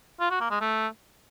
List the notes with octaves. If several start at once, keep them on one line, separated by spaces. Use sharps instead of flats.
F4
F#4
A#3
G#3
A3